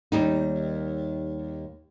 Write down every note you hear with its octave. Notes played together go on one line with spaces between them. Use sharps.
D#2 G3 D#4